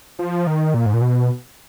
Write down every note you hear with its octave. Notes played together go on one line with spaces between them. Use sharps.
F3
D#3
A#2
G#2
A#2
B2